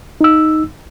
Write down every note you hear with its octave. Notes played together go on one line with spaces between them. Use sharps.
D#4 E6